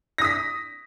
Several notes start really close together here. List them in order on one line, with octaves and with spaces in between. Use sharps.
A#6 D#6 B6